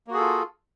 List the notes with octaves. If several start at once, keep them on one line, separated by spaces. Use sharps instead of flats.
A#3 F4 F#4 G#4 A4